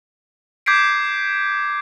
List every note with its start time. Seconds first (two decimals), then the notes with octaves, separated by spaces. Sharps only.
0.66 D6 G6 G#6 B6 C7 D7